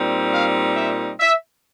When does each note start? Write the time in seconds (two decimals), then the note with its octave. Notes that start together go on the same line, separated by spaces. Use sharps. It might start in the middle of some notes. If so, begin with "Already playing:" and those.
Already playing: A#2 G3 C4 D#4
0.33 F5
0.76 E5
1.19 E5